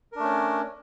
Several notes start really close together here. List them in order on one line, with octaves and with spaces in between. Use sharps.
A#4 D4 A3 C#4